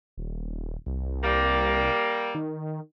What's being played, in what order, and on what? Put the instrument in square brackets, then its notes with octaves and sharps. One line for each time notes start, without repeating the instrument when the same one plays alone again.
[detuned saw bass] D#1
C2
[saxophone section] G3 A#3
[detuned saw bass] D#3